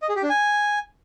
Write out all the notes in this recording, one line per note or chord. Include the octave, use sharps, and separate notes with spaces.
D#5
G#4
G4
D4
G#5